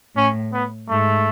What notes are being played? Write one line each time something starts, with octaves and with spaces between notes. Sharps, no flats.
A2 C#4
B3
G#2 A3